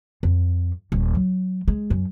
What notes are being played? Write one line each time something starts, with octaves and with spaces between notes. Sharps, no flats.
F2
D#1
F#3
G#3
F#2